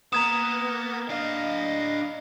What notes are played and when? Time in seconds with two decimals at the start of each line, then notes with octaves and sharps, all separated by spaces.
0.13 A#3 B3 A#5 D#6 G#6 E7
1.10 D4 D#5 F5